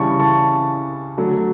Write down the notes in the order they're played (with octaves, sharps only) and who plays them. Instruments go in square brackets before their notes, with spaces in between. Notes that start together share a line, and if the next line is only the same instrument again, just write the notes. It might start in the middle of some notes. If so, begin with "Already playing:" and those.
Already playing: [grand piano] C#3 E3 G3 A5 C#6
A5 C#6
D3 F#3 A3